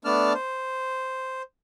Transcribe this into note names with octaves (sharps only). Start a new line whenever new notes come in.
A3 B3 D4 D5 A5 F6
C5